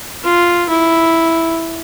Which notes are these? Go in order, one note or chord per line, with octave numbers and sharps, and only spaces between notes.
F4
E4